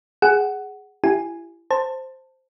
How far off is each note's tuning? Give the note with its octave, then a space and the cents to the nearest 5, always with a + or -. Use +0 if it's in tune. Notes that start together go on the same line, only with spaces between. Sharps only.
G#4 +0 F#5 +15
E4 +30 G4 -5 G#5 +0
C5 +0 A5 +20